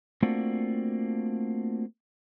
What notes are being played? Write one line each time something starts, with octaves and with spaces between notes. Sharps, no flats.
A3 A#3 C4 D4 F4 F#4